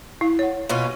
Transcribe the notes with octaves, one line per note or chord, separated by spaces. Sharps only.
E4 F5
C#5 F#5
B2 C#4 F4